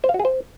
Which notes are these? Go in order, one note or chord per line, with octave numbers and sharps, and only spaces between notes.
C5
F5
F#4
G#4
C5